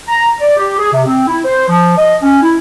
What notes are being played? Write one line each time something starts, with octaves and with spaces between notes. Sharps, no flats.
A#5
D5
G4
G#4
C3
C4
E4
C5
F3
D#5
C#4
E4